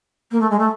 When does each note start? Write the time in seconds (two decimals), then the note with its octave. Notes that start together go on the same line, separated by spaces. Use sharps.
0.31 A#3
0.40 A3
0.50 G#3
0.59 A3